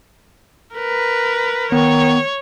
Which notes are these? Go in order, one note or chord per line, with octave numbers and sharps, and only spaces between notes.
A#4 B4
D#3 B3 C#5